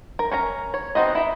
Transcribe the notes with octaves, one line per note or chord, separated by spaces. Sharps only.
A#4
C#4 A#4 A#5
C#5
B3 C4 D#4 F#4 D#5
E4 E5